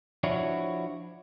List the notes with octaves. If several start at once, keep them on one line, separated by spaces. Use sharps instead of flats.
F3 D4 E4 F#4 C#5